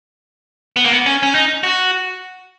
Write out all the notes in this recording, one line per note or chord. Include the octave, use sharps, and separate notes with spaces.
B3
A#3
B3
C#4
C#4
D#4
F#4